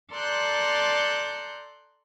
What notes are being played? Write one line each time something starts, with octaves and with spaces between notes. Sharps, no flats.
A4 D5 A#5 C6 F#6 G6